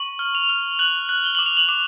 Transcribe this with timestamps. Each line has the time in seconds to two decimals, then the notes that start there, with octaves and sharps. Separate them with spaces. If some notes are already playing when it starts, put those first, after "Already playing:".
Already playing: C#6 F#7
0.19 F6
0.35 F7
0.49 F6
0.79 F#6 F#7
1.09 F#6
1.24 G7
1.35 D6 F#7
1.46 F7
1.57 F#7
1.69 D6 F7